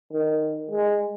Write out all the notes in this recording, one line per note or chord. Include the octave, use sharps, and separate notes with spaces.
D#3
G#3